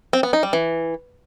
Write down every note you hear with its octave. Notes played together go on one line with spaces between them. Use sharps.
C4
B3
D#4
G3
E3